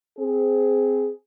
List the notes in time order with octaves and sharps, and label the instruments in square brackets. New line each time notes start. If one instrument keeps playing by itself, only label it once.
[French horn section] C4 G#4